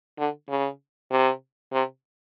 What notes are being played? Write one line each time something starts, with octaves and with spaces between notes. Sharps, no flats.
D3
C#3
C3
C3